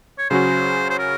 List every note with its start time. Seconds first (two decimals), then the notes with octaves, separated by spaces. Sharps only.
0.18 C#5
0.30 C#3 F#3 C#4 F#4 C5
0.90 C5
0.99 A#4